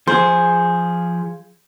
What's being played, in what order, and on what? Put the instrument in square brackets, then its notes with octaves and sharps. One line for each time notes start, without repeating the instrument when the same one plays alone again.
[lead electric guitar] F3 G#4 [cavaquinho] C5